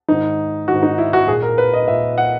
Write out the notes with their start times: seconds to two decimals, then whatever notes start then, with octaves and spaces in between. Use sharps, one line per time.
0.09 G#2 D#3 D#4
0.68 G#2 D#3 F#4
0.83 D#4
0.98 E4
1.13 F#4
1.28 A#2 G#4
1.42 A#4
1.58 B4
1.74 D#5
1.88 A#2 E5
2.18 F#5